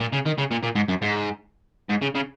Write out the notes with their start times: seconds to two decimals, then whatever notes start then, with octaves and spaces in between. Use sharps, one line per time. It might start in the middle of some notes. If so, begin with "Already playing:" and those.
0.01 A#2
0.13 C#3
0.26 D#3
0.38 C#3
0.51 A#2
0.63 A#2
0.75 G#2
0.88 F#2
1.02 G#2
1.90 G#2
2.02 C#3
2.15 C#3